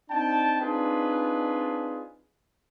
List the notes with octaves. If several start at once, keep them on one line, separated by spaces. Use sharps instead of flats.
C4 D4 D#4 G5 A5
C4 D4 D#4 F4 G#4 B4